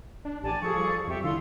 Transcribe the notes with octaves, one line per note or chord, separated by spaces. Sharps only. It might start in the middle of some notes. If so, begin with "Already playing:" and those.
D4
A1 G4 D5 G#5 A5
F3 G#4 A4 C#6
G3
F2 G4 E5 C#6
D3 E4 F4 C6 E6